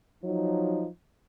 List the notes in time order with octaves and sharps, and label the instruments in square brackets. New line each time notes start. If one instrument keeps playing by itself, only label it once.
[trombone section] F3 F#3 D#4